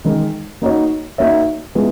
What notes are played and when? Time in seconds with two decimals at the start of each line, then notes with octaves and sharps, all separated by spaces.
0.04 D#3 G#3 D#4 A#4
0.62 A#3 D#4 F#4 C#5
1.18 A#3 D#4 F#4 C#5 E5
1.75 G#3 B3 E4 G#4